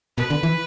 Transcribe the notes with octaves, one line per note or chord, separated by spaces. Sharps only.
B2 B4
D3
E3